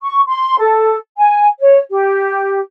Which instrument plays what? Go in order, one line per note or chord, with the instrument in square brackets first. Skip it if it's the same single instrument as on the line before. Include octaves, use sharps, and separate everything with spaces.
[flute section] C#6
C6
A4
G#5
C#5
G4